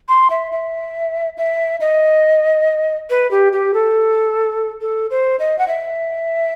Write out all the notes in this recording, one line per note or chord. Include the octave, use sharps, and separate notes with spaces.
C6
E5
E5
E5
D#5
B4
G4
G4
A4
A4
C5
D#5
F#5
E5